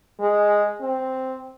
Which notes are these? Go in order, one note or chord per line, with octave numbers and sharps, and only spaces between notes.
G#3
C4